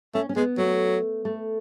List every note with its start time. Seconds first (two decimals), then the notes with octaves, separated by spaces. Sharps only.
0.14 A3 C#4
0.29 C#4
0.36 G#3 B3
0.58 F#3 A3
1.25 A3